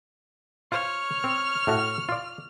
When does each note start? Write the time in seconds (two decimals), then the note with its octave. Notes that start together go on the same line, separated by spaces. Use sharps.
0.72 F4 C5 C#5 F6
1.24 C4
1.67 A2 A3 F#4
2.09 F4 D5